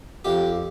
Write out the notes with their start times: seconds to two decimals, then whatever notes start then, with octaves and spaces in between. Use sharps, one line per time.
0.25 F2 G4